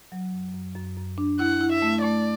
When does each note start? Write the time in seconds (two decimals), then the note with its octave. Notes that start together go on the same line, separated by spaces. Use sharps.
0.12 F#3
0.32 F#2
0.54 F#2
0.75 F#2
0.97 F#2
1.18 D4
1.39 E4 F#5
1.61 E4
1.72 E5
1.82 A3
2.04 A3 D5